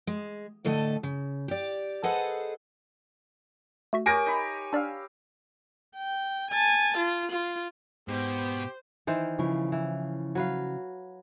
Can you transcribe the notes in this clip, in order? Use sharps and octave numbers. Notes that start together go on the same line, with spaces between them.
G#3
A2 D3 A3 A4 D#5
C#3
G4 D5
G#4 A4 B4 C5 D#5 F#5
A3 F#4 E5
G4 A#4 C#5 G#5 A#6 D7
D#4 B5
D4 D5 F5 E6
G5
G#5 A5
F4
F4
G#2 B2 G4 C5
D#3 E3 C5
C#3 F3 E4
E3
F#3 B4 F5